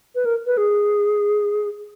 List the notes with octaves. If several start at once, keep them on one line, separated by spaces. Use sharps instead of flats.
B4
A#4
B4
G#4